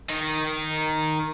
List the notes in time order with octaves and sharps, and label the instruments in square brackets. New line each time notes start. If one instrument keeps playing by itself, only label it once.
[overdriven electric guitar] D#3 D#4